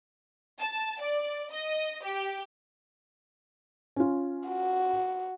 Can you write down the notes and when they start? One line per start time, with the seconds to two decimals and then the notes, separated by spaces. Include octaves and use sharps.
0.59 A5
1.02 D5
1.52 D#5
2.05 G4
3.96 C#4 F4
4.47 F#4